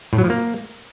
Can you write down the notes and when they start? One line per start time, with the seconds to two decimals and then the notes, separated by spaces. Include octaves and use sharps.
0.13 A2
0.18 F#3
0.24 F3
0.30 A#3